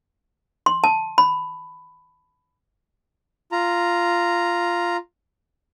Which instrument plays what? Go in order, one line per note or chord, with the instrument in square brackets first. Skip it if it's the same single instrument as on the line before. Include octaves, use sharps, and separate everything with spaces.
[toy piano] C6
A5
B5
[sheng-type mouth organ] F4 A#5